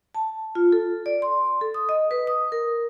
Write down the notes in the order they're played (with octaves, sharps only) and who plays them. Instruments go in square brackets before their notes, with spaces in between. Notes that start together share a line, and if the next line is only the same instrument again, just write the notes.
[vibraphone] A5
F4
A4
D5
C6
A4
D#6
D#5
B4
D#6
A#4